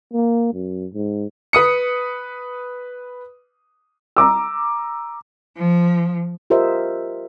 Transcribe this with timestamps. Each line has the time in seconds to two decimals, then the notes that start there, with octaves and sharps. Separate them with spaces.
0.13 A#3
0.54 F#2
0.94 G#2
1.53 B4 D#6 C#7
4.17 A#5 D6 E6
5.57 F3
6.50 F4 G4 A#4 C5 D#5 E5